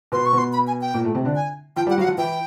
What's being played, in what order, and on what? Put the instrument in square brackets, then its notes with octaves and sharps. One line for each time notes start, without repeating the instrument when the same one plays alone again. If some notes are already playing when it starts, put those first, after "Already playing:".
[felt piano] B2 B3 [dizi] C6
[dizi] C#6
[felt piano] B2 B3 [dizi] C6
[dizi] B5
G#5
G5
[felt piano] A#2 A#3
A2 A3
C3 C4
D3 D4
[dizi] G#5
[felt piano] F3 F4 [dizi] G5
[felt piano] G3 G4 [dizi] F#5
[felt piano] F#3 F#4 [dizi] F5
[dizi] F#5
[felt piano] F3 F4
[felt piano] E3 E4 [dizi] G5